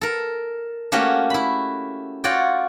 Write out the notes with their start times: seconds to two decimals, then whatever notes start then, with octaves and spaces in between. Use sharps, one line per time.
0.01 A4 A#4
0.92 A3 A#3 C#4 F#4 G4
1.30 E4 B5
2.24 F4 F#4 C#5 D5 G5